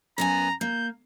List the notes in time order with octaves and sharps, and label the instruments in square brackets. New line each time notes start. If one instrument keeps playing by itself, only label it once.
[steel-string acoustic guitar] F#2 B3 G#5 [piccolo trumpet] A#5
[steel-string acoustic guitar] A#3 [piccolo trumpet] G6